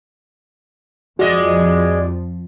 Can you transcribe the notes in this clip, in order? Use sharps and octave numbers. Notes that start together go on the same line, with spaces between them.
F2 F3 G#3 F#4 D5 D#5